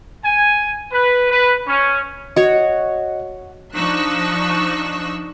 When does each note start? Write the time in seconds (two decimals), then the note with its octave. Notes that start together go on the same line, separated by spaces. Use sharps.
0.24 G#5
0.92 B4
1.29 B4
1.67 C#4
2.36 F#4 C#5 D#5
3.75 F3 D4 D#4 C#6 E6 F#6